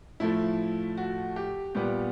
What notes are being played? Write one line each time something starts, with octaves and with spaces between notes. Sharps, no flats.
A2 F3 A3 E4
F#4
G4
A#2 G3 B3 G4